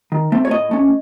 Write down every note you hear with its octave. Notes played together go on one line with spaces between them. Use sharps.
D#3
A3 C4
C#5
A2 D#5
A3 C#4